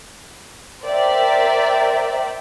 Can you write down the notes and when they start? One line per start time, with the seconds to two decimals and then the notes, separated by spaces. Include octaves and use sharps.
0.84 A#4 C5 D5 E5 G5